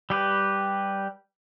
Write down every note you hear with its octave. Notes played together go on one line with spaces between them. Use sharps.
G3 G4 B4